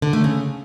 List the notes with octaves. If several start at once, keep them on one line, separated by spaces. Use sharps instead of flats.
D3
A3
C#3